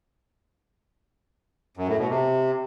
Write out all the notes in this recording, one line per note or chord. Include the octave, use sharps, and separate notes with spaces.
F#2
A2
B2
C3